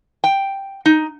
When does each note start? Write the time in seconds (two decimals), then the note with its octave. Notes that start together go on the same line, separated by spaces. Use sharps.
0.24 G5
0.85 D#4